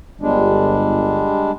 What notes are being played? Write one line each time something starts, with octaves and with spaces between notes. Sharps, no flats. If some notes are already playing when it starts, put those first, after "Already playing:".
G1 G3 G#3 D4